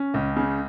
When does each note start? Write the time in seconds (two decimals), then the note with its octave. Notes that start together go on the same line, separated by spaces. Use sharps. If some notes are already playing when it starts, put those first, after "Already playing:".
Already playing: C#4
0.14 C#2
0.37 C#3